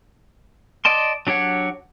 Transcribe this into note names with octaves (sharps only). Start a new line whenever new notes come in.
D5 D#5 A5 C6
F#3 D4 G4 C#5 F#5